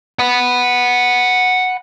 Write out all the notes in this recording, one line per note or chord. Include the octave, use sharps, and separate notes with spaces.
F#5 B5